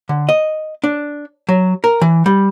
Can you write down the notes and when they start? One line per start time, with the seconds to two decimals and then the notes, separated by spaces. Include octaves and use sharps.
0.09 D3
0.29 D#5
0.84 D4
1.49 F#3
1.84 A#4
2.02 E3
2.26 G3